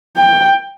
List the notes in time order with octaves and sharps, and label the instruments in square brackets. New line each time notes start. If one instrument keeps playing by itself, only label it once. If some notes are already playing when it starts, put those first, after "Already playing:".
[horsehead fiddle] G5